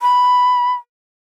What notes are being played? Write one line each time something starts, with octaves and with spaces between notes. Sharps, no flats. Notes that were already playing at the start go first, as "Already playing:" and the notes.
B5